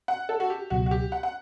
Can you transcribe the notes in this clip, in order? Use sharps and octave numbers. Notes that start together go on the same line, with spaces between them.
F#5
A4
F#4
G4
C#2 B2 F#3 F#4
F#4
G4
F#5
F#5